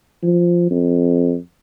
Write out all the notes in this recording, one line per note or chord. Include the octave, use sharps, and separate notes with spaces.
F3
F2